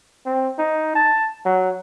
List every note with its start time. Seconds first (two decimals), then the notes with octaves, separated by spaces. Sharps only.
0.26 C4
0.59 D#4
0.95 A5
1.46 F#3